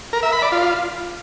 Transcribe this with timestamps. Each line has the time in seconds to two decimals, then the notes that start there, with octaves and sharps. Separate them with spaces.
0.13 A#4
0.23 E5
0.32 B5
0.42 D5
0.52 F4